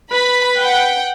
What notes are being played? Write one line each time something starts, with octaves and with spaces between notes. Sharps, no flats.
B4 B5
F#5 G5